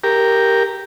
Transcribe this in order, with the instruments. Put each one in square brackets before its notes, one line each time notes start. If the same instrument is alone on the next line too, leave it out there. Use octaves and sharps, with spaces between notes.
[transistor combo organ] G4 A#4